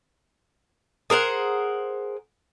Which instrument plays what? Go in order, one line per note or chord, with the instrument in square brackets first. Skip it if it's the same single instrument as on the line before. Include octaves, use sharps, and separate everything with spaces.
[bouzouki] G#4 A#4 C5 F#5